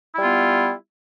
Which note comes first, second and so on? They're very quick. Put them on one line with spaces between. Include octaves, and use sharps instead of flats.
E4 G3 F4 B3